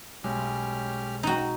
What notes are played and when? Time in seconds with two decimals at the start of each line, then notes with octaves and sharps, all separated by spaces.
0.24 B1 G#3 C#4 G4 F6
1.23 D#4 F#4